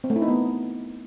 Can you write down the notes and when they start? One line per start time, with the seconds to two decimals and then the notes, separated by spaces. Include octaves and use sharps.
0.04 C4
0.10 A3
0.16 E4
0.22 D#4
0.28 B3